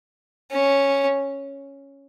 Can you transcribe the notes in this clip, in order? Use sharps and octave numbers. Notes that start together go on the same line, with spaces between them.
C#4